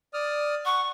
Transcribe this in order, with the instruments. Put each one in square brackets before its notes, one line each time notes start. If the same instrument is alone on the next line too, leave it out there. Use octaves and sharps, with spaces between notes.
[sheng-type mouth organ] D5 D#6 F6
[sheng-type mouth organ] F#5 [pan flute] C#6